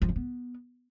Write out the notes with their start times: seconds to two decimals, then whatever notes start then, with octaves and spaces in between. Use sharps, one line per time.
0.02 F3
0.09 C#4
0.16 B3